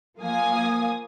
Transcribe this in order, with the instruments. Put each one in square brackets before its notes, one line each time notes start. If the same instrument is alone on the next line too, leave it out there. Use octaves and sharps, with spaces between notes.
[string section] F3 A#3 F5 G#5 D#6